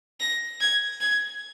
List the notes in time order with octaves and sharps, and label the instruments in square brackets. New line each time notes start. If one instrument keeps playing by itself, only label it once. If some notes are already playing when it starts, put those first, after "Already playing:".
[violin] A#6
G#6
G#6